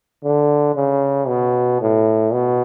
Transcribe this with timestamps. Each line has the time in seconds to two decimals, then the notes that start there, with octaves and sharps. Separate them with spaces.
0.24 D3
0.75 C#3
1.28 B2
1.81 A2
2.33 B2